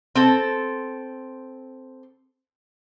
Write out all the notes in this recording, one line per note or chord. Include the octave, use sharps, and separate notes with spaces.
C4 A4